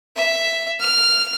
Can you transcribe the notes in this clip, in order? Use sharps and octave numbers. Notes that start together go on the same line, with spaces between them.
E5
F6